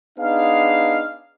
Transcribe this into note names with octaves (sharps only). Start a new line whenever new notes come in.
B3 D4 D#4 G#4 F5